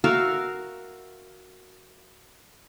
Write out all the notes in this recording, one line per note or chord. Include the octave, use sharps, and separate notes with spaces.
F#4 A#4 E5 F5